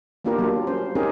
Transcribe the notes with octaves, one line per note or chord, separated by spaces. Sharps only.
A#3 B3 D4 F4 G4 A#4
F#3 G3 A#3
C#4 C5
C4 C#4 D#4 G4 G#4 A#4